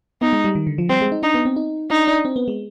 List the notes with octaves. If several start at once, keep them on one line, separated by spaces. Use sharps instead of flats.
B3 D#4
G#3
G3
D#3
D3
F3
G3 C4
G#3
D#4
D4 D#4
B3
C4
D#4
D4 D#4
D4
C4
B3
G#3